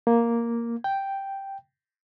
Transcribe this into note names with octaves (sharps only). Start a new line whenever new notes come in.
A#3
G5